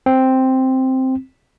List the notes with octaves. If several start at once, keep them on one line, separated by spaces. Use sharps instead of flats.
C4